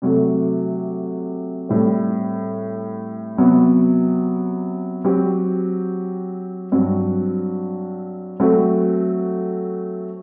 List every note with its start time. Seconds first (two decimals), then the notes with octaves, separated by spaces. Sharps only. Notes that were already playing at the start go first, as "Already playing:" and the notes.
0.02 C3 F#3 A3
1.69 A2 G3 C4
3.37 C3 F#3 B3
5.05 F#3 C4 G4
6.72 G2 F#3 C4
8.40 F#3 A3 C4 F#4